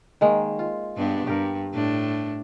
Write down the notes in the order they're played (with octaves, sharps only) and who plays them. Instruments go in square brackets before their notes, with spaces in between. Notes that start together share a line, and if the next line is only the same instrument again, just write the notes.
[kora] D#3 G#3 A#3
F4
[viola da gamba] G2 B3 D4
[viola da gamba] G2 [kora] G4 A#4
[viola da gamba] A2 D4